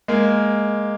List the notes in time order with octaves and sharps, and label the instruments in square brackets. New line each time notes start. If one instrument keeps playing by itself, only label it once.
[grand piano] G#3 A#3